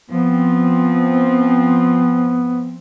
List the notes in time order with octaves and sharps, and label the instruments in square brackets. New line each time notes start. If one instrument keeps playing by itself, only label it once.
[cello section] F3 C4 [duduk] B3